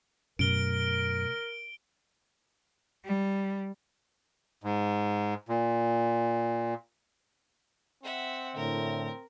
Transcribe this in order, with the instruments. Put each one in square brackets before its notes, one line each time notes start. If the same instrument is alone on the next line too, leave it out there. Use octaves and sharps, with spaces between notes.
[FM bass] F#2 [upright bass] B2 A3 [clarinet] A#4 [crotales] D7 G7
[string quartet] G3
[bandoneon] G#2
A#2
[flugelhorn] C4 [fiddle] E5 F#5
[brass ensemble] A2 D3 [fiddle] A#4